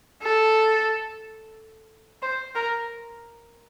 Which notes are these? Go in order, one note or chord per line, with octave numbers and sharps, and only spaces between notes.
A4
C5
A#4